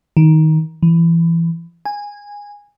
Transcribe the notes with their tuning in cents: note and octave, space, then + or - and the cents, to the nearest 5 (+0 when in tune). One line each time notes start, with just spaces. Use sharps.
D#3 +15
E3 +20
G#5 -15